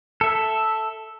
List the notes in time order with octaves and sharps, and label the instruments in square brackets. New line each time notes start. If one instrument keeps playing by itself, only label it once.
[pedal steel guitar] A4 E5